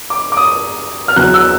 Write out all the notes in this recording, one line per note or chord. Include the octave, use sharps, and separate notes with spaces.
D6
D6
D#6
F6
E2 C#3 F#3 F#6
E6